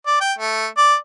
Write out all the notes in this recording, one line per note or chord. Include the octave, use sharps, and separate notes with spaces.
D5
G5
A3
D5